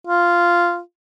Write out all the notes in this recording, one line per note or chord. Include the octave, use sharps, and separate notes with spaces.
F4